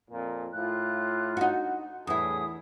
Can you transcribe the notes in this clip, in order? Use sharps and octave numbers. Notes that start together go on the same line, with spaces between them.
F2 A#2
A2 F4 F#6
D#4 F#4
E2 A2 G3 E4 G#4 D#6